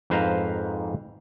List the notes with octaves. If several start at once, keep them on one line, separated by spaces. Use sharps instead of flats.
F2 G#2 B4 C5 F5 A#5